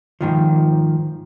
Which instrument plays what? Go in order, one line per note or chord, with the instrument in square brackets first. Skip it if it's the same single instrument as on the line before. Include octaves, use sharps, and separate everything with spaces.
[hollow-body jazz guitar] G#2 D#3 F3